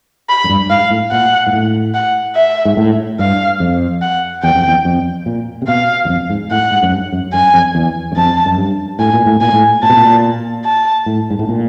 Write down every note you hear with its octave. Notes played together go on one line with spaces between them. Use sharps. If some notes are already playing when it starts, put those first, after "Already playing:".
B5
F#2
G2
G#2 F5
A2
A#2 F#5
G#2
A2
F#5
E5
G#2
A2
G2 F5
F2
F#5
E2 G5
F2
E2
F2
A#2
C3
B2 F5
E2
F2
G#2
A2 F#5
G#2
F#2
G2
F#2
F#2 G#5
F2
E2
F#2
F2 A5
F#2
G2
A2 G#5
A#2
A2
A#2 G#5
A2
A#2 A5
B2
A#2
A5
A2
G#2
A2
A#2